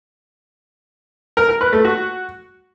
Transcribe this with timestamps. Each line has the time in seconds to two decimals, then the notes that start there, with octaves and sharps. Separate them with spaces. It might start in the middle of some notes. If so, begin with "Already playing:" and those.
1.37 A#4
1.49 A#4
1.61 B4
1.73 A3
1.85 F#4